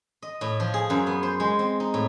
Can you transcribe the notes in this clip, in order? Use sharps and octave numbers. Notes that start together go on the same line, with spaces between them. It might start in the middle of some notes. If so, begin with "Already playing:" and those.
D#5
A2
F3
G#4
F#2
B3
C5
G#3
C4
D#4
A2